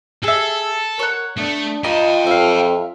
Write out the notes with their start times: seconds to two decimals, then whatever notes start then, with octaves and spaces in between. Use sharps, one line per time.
0.24 G#4 A4 E5
0.99 A#4 C#5 F#5
1.38 A3 B3 D4
1.84 F4 A#4 D#5 G5 A5 B5
2.27 F2 E5 F5